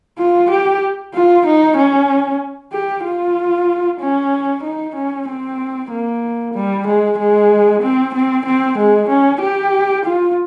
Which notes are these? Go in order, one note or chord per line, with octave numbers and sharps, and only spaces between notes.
F4
G4
F4
D#4
C#4
G4
F4
C#4
D#4
C#4
C4
A#3
G3
G#3
G#3
C4
C4
C4
G#3
C#4
G4
F4